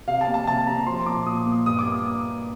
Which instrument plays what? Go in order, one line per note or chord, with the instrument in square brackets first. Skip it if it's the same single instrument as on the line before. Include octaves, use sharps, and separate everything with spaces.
[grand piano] C3 F5
A5
A#3
A5
C3 A5
C3 A#5
F3 C6
A#2 D6
A#2 D#6
A#3
G2 D#6
D6
A#3